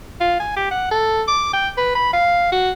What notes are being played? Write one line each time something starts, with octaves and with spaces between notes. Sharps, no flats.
F4
G#5
G4
F#5
A4
D6
G5
B4
B5
F5
F#4